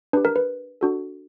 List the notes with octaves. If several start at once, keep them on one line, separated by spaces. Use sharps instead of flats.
D4 G4 B4
A#4
B4
D4 F#4 A4